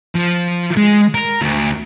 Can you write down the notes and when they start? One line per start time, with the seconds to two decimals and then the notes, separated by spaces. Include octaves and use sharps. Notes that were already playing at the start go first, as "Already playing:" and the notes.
0.15 F3
0.77 G#3
1.14 A#4
1.42 D2